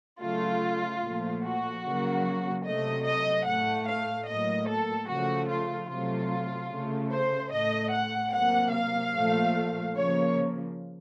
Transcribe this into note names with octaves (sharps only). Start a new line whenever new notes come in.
C#3 F#3 A3 F4
A#2 F3 A3
F#4
C#3 F#3 A#3
C3 F#3 A3 D#5
D#5
A2 A3 F#5
F5
A2 F#3 A#3 D#5
A4
C#3 F3 A3 F#4
F4
C3 F#3 A3 F4
C#3 A3
C5
A2 A3 D#5
F#5
C3 F#3 A#3 F#5
F5
A#2 F3 A3
C#3 F3 A#3 C#5